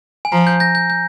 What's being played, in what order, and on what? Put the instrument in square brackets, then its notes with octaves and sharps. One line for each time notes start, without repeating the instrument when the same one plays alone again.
[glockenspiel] G#5
[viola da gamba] F3 [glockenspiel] A#5
[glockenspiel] G6
G6 A#6
G6
G6